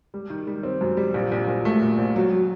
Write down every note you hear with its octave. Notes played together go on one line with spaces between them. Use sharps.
G3
D#3
G3
C4
F#2
G3
A#1
A#1
A#1
A3
A#2
A#1
F#3
F#3